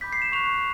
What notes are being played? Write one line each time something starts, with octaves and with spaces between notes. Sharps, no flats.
B5 D6 G6 B6
C7
E7
C#6 F#6 F7